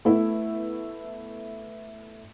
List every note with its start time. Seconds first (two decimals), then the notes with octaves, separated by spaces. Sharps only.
0.05 A3 B3 E4